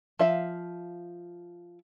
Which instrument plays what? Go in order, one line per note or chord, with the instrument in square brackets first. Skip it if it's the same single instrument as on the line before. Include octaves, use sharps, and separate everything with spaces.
[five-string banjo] F3 E5 F5